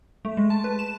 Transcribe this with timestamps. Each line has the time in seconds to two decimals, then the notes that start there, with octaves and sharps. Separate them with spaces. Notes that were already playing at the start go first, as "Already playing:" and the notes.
0.25 A3
0.37 G#3
0.50 A5
0.64 B4
0.79 E7